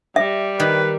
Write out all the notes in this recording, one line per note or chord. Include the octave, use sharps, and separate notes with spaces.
G3 E5
D#3 B4